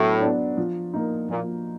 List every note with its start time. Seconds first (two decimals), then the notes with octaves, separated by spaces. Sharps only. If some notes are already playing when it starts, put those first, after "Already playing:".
Already playing: A2 F#3 B3 D4
0.21 B3 D4
0.57 F3
0.93 A#3 D#4
1.29 A#2 F3